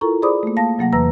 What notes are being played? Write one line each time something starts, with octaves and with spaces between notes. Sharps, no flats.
E4 F4 A4 A#4 A#5 C#6
G#4 C5 D5 B5 D6 D#6
A3 A#3
A#3 F5 A5 A#6
C3 F#3 A#3 F#5 A#6
E2 E3 B4 A#5 E6 A#6